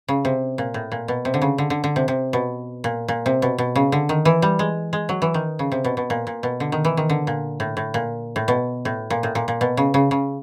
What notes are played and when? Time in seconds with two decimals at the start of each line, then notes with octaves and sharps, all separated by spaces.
0.08 C#3
0.25 C3
0.58 A#2
0.74 A2
0.92 A#2
1.08 B2
1.25 C3
1.34 D3
1.42 C#3
1.58 D3
1.70 D3
1.84 D3
1.96 C3
2.08 C3
2.33 B2
2.84 A#2
3.08 A#2
3.26 C3
3.42 B2
3.58 B2
3.76 C#3
3.92 D3
4.09 D#3
4.25 E3
4.42 G3
4.59 G#3
4.93 G#3
5.09 F#3
5.22 E3
5.34 D#3
5.59 C#3
5.72 C3
5.84 B2
5.97 B2
6.10 A#2
6.27 A#2
6.43 B2
6.60 D3
6.72 D#3
6.85 E3
6.97 D#3
7.10 D3
7.27 A#2
7.60 A2
7.77 A2
7.94 A#2
8.36 A2
8.48 B2
8.85 A2
9.10 A#2
9.23 A2
9.35 A#2
9.48 A#2
9.61 B2
9.77 C#3
9.94 C#3
10.11 C#3